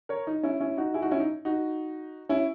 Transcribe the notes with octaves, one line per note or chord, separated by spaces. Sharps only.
A#4 C#5
D#4
C#4 E4
C#4 E4
D#4 F#4
E4 G#4
D#4 F#4
C#4 E4
D#4
D#4 F#4
C#4 E4